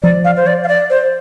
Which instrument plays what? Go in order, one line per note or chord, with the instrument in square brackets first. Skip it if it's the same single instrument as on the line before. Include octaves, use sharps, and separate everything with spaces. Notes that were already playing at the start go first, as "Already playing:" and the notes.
[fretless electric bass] F3 [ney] D5
[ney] F5
C5
D5
F5
D5
C5